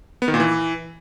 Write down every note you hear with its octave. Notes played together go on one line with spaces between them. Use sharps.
B3
D#3
A#2
E3